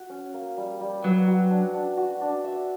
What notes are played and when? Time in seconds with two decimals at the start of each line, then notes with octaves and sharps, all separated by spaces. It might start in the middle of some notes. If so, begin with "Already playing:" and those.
Already playing: F#4
0.09 C#4
0.34 A#3
0.57 G3
0.81 G3
1.03 F#3 B4
1.28 F#4
1.50 D4
1.74 D4
1.97 F#4
2.21 D4
2.44 E5